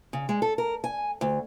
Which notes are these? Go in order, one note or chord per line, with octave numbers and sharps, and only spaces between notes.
C#3
G#3
A4
A#4
G#5
D2